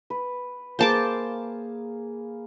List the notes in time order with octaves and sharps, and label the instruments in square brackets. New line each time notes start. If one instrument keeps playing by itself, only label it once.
[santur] B4
[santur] A#3 G#4 F5 [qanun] C5 A5 D6